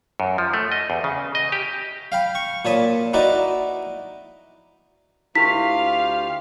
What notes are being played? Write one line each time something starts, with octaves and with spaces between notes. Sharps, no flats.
F#2
F3
A3
D#5
E2
C#3
D#5
G4
F5 G5 B5
C#6
A#2 C#5 A5 B5 D#6
D#4 E4 F#4 B4 D5 D#5
D2 E4 F4 G4 A#4 F5 C#6 B6